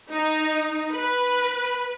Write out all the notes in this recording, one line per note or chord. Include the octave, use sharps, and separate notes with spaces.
D#4
B4